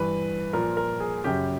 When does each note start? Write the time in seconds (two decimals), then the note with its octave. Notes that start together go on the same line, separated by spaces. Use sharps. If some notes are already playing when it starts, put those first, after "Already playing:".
Already playing: G2 E3 B4
0.53 A#2 F3 A#4
0.77 A#4
1.00 G#4
1.24 F#2 C#3 F#3 G4